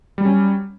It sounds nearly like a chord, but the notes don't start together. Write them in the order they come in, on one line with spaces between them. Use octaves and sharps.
G3 F#3 C#4